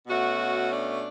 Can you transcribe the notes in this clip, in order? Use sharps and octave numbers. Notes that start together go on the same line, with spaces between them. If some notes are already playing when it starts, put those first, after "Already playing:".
B2 A3 C#4 F#4
D4